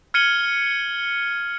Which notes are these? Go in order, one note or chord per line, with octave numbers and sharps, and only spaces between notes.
F6 G#6 C#7 D#7 F#7 G7